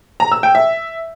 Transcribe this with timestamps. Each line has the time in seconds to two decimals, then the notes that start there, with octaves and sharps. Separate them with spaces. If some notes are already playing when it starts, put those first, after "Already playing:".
0.20 A#5
0.32 E6
0.43 G5
0.55 E5